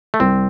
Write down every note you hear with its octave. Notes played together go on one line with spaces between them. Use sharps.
A3
C2 C4